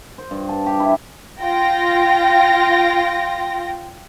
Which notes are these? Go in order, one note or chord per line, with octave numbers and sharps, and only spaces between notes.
C5
G2
A5
G4
E4
F4 G5 A#6